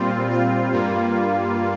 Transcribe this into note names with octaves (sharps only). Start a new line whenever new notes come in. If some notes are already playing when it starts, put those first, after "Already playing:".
Already playing: A#2 G3 C4 F4
F4
G2 G3 A#3